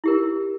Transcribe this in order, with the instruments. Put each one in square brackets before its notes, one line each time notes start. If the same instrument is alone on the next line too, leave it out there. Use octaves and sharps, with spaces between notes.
[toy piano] E4 G4 A#4